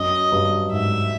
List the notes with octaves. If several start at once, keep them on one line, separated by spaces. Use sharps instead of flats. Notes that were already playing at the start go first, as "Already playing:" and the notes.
Already playing: F#2 D#5
G2
G#2 E5